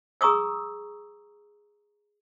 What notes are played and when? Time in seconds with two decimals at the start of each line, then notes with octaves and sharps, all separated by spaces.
0.21 G#4 A#5 C#6 D#6 E6